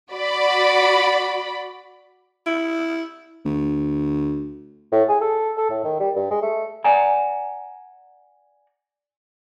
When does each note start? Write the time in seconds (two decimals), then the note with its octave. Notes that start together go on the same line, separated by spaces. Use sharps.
0.13 F#4 D5 B5
2.47 E4
3.45 D2
4.92 A2
5.09 G#4
5.21 A4
5.57 A4
5.70 A2
5.84 D#3
6.00 G3
6.16 G2
6.31 G#3
6.42 A3
6.84 D5 F#5 G#5 A#5